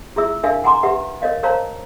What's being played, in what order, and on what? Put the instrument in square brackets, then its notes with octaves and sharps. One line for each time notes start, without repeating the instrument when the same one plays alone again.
[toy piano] E4 F4 G#4 E5 E6
D4 D#4 A#4 E5 F5 G#5
F#5 G#5 A#5 C6 D6
G4 B4 E5 F#5
A#4 C#5 D#5 F5
A#4 C5 C#5 F5 A5 A#5